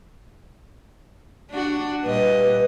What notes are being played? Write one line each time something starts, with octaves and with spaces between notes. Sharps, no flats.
D4 F#4
A#2 G3 B4 D#5